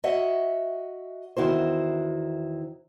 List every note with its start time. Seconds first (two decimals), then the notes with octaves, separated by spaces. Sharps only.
0.04 F#4 D#5 E5 F#5
1.37 E2 D#3 E4 F#4 C5